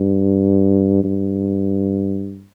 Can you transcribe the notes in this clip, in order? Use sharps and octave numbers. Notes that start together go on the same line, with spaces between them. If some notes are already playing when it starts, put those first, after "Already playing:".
Already playing: G2
G2